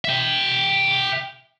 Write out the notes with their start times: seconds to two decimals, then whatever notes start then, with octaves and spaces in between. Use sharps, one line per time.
0.05 E5 G5